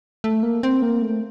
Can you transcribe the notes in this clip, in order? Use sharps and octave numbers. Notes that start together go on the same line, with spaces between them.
A3
A#3
C4
A#3
A3